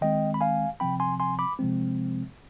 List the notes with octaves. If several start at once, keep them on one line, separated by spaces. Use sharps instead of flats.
D#3 G#3 C4 D#5 G5
B5
F5 G#5
C3 F3 C4 G5 B5
G#5 C6
G#5 C6
B5 D6
C3 F3 G#3 C4